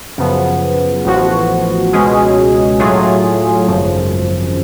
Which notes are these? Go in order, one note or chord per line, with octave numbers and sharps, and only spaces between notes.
F#2 C#3 F3 B3
A1 A2 F3 B3 F#4
C#2 B2 G#3 C#4 G#4
A2 F#3 A3 F4 G#4
G#1 F#2 C#3 F3